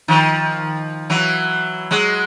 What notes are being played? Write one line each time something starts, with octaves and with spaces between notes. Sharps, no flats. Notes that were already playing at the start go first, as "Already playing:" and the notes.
D#3 F3
E3 F#3
F#3 G#3